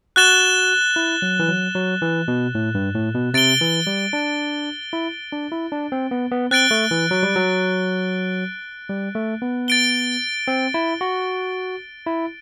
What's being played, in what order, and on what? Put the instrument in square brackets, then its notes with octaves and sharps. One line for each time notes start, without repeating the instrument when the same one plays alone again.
[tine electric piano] F#4 [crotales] F#6 A6 E7 G7
[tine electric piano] E4
F#3
E3
F#3
F#3
E3
B2
A2
G2
A2
B2
[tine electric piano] C3 [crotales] A6 D7 G7
[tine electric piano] E3
G3
D4
E4
D4
E4
D4
C4
B3
B3
[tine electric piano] C4 [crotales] F#6 A6 D7 G7
[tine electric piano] A3
E3
F#3
G3
F#3
G3
A3
B3
[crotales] A6 D7 G7
[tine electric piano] C4
E4
F#4
E4